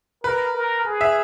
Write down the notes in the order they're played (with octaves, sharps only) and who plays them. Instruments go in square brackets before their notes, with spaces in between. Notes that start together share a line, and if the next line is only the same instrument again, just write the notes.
[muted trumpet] A#4 [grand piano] B4
[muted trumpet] A#4
G#4
[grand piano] E5